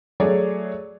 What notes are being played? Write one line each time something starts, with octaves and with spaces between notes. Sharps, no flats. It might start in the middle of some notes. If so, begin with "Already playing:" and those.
F#3 A3 G#4 C#5 D5